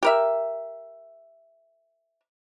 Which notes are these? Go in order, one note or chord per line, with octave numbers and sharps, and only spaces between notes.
G4 A#4 E5